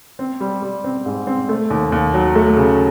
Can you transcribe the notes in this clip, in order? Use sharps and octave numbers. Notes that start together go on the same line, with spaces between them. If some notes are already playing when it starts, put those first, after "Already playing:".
C4
G3
G3
C4
G#2
C4
A3
D#2
D#2
F#3
A3
C#3